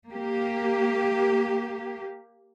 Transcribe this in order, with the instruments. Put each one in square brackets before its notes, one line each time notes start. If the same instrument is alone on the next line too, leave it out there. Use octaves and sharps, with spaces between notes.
[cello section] A#3 G4